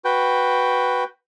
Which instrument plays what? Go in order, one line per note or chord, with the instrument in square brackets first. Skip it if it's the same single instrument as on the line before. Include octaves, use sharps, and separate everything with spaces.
[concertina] F#4 B4 G5